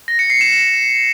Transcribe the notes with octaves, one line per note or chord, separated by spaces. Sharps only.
A#6
C#7
C7
E7